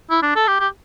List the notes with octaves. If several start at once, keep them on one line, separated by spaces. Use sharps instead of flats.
E4
D4
A4
G4
G4